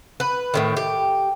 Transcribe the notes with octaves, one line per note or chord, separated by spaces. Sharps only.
B4
A2 C3 D#3
G4